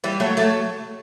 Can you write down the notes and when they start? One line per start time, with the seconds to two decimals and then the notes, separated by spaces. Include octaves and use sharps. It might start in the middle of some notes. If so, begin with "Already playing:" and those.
0.04 E3 G3
0.20 F#3 A3
0.37 F#3 A3